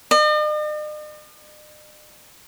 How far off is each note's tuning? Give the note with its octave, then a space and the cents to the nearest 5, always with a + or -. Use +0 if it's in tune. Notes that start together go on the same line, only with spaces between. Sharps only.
D#5 -45